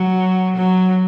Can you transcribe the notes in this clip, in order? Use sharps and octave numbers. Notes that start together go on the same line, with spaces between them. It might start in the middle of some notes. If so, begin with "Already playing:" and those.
Already playing: F#3
F#3